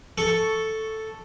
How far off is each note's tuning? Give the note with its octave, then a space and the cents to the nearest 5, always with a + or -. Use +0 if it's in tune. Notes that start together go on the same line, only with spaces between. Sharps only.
A4 +0 C#6 +0